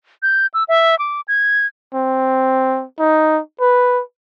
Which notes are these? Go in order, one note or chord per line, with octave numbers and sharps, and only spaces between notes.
G6
E6
E5
D6
G#6
C4
D#4
B4